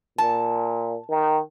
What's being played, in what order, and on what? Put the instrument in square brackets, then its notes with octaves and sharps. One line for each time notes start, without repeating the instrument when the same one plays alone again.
[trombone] A#2 [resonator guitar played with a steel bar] A5
[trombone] D#3